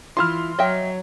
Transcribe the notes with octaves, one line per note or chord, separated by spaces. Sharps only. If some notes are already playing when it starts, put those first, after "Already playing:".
E3 E4 F4 C6 F6
F#3 C#5 D#5 E5 G5